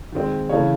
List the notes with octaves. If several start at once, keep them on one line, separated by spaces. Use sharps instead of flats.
D#3 G#3 C4
C#3 E3 A3 C#5